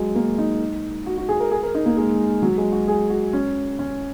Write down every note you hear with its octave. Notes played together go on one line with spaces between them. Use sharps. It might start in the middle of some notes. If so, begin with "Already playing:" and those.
Already playing: F#3 G#3
A#3
D#4
F#4
F#4
G#4
A#4
G#4
A#4
D#4
A#3
G#3
F#3
G#3
F#4
G#4
F#4
C#4
C#4